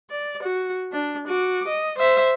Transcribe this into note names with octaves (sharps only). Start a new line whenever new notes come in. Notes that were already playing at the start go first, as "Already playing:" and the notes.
D5
F#4
D4
F#4 D6
D#5
C5 E5